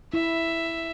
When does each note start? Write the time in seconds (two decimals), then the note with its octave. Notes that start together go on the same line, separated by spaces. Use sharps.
0.14 E4 E5